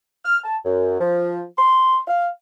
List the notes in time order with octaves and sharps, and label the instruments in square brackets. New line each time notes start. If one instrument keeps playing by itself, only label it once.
[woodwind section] F6
A5
F#2
F3
C6
F5